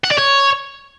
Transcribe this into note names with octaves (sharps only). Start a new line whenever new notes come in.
F#5
D5
C#5